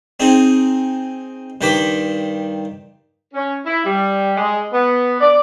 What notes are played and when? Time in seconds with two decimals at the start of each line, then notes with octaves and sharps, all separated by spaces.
0.20 C4 D#4 G#4
1.61 G2 D#3 C5 G5 B5 D6
3.34 C#4
3.66 E4
3.85 G3
4.37 G#3
4.73 B3
5.20 D5